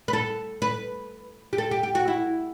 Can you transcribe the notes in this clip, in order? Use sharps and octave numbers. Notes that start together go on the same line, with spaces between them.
B4
A4
B4
G4
A4
G4
G4
F#4
E4